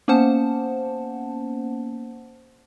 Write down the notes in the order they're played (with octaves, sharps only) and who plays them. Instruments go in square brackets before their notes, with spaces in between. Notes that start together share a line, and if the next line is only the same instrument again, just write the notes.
[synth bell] A#3 B3 C#4 C5 F#5 A5